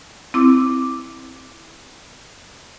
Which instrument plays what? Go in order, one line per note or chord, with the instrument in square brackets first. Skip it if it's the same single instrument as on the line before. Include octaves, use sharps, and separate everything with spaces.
[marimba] C4 E4 D6